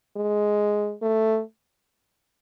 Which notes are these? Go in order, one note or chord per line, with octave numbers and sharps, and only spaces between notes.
G#3
A3